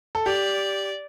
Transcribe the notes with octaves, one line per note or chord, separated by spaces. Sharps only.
A4
G4 D5